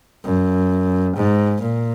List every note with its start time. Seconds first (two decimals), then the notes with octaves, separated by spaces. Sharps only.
0.24 F#2
1.16 G#2
1.61 A#2